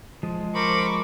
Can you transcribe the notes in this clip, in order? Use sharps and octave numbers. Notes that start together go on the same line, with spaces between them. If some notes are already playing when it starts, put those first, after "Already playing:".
F3 G#3
A#4 C5 B5 C#6 D6